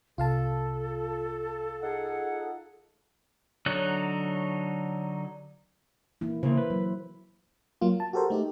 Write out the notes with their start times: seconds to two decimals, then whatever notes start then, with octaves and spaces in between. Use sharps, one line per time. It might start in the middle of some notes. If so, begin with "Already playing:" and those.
0.18 C2 F4 A4 F5 A5
1.83 D#4 G#4 F#5
3.66 D3 F#3 D#4 C#5 F#6
6.21 E3 A#3 E4
6.43 C#3 A#3 E4 C5
6.57 B4
6.70 F#3
7.81 F#3 A#3 F4
8.00 A5
8.13 F#4 G4 A4 A#4 C5
8.30 A3 D#4 G4